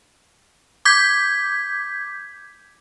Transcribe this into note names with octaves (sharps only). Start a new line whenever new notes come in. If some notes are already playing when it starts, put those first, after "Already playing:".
D6 G6 G#6 B6